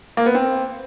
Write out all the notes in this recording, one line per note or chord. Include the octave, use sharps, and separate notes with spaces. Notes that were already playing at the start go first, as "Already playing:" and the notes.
A#3
B3
C4